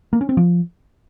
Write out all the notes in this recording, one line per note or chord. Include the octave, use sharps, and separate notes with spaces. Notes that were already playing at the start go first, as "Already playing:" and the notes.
A#3
C#4
C4
F3